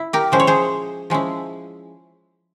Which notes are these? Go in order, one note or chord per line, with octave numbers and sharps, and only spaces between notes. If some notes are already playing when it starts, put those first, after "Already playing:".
Already playing: E4
G4 A#4
F3 G#3 C#4 E4 C5
C#5
G#4 C5
F3 G#3 C#4 E4